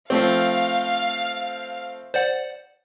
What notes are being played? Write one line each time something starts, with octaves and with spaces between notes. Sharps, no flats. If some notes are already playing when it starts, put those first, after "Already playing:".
F3 A3 C4 F5
C5 D5 F#5